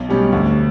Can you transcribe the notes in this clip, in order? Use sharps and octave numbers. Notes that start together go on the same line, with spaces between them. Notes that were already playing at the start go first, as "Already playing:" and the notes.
Already playing: B1
B2 G3 C#4 G4
D2